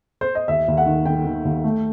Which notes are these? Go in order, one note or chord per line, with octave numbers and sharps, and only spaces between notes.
C5
D#5
D#2 E5
D#2
F#5
D#3
D#3 G5
D#3
D#2
A3